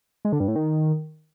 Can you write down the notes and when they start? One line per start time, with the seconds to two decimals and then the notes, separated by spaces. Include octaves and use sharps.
0.25 G#3
0.32 D3
0.40 G2
0.48 A2
0.56 D#3